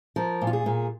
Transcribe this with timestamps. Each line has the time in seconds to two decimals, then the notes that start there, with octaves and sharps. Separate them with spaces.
0.16 F3 A#4
0.41 A#2
0.47 F4
0.53 G#4
0.66 A#2